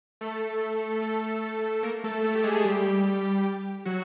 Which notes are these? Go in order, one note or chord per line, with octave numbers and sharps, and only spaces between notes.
A3 A4
A3 A4
A#3 A#4
A3 A4
A3 A4
G4
G#3 G#4
G#4
G3 G4
F#3 F#4